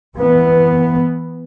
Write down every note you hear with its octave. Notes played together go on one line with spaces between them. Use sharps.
E3 B3